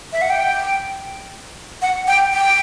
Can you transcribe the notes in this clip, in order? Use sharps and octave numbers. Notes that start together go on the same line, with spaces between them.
E5
F#5
G5
F#5
G5
G5